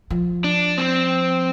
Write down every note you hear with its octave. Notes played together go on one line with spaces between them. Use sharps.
F3
D4
C4